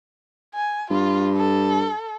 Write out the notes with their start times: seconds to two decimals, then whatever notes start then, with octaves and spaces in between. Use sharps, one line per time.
0.55 G#5
0.90 G2 F4
1.37 A4